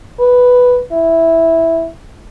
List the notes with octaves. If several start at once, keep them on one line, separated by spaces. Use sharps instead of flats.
B4
E4